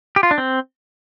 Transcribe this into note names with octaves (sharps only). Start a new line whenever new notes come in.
G4
F4
D4
C4